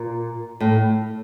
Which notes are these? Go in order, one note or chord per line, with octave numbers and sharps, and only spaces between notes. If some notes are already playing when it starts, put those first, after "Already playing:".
Already playing: A#2
A2